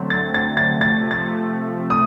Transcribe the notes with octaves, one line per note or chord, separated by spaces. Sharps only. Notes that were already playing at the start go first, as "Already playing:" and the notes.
Already playing: D3 F#3 A3 C4
A6
A6
A6
C3 F3 A3
A6
A6
D#6